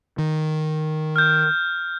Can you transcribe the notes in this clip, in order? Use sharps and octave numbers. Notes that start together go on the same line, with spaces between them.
D#3
F6 G6